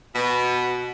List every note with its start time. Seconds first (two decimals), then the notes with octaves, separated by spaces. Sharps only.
0.15 B2